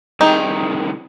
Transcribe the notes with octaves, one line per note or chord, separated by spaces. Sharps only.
C2 D#3 D#4 G4 G#4